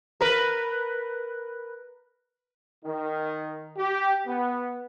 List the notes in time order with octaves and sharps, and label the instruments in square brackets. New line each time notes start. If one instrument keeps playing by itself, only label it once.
[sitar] A#4 B4
[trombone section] D#3
G4
B3